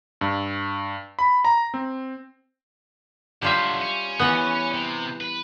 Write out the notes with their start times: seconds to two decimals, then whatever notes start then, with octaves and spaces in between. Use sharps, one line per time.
0.21 G2
1.19 B5
1.45 A#5
1.74 C4
3.42 D3 F#3 G3 F4 E5
3.82 C#4
4.19 E3 B3
4.74 C3
5.21 B4